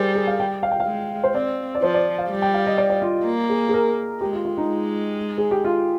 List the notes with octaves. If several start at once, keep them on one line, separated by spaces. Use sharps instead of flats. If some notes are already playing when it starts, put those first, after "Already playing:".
Already playing: G3 G#4 A#4 C5
G#4
F5
G5
F5
G5
F5
G#3
C5
C4 D5
D5
F3 C5
D5
F5
G3
G5
F5
D#5
D5
D5
F4
A#3
G#4
G#4
A#4
G#3 G4
F4
F4
D#4
G#3
G#4
G4
F4